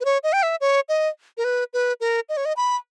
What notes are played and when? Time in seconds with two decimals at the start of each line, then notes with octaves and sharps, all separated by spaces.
0.01 B4
0.05 C#5
0.23 D#5
0.33 G5
0.43 E5
0.61 C#5
0.89 D#5
1.38 A#4
1.44 B4
1.73 B4
2.01 A#4
2.29 D#5
2.37 C#5
2.45 D#5
2.57 B5